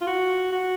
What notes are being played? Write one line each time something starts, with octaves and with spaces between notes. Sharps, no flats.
F4
F#4
F#4